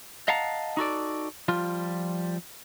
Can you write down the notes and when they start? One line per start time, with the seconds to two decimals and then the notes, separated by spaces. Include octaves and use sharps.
0.28 D#5 F5 F#5 A5 A#5
0.77 D#4 F#4 A4 D5
1.48 F3 G3 F4